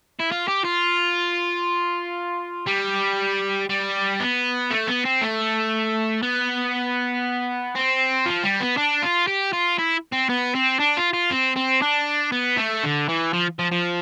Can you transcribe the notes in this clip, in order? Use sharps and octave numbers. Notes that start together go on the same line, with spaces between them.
E4
F4
G4
F4
G3
G3
B3
A3
B3
C4
A3
B3
C4
F3
G3
B3
D4
F4
G4
F4
E4
C4
B3
C4
D4
F4
F4
C4
C4
D4
B3
A3
D3
E3
F3
F3
F3